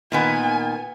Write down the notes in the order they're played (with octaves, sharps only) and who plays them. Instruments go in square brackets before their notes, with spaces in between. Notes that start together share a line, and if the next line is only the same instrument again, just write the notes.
[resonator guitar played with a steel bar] A#2 D#3 B3 [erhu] G#5